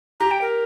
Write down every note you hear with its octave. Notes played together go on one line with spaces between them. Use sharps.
G4 A#5
G5
A#4